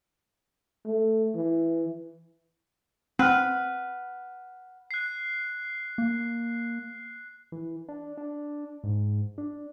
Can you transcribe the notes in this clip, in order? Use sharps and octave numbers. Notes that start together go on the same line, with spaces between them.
A3
E3
C4 B4 F#5 F6
F#6 C7
A#3
E3
D4
D4
G#2
D4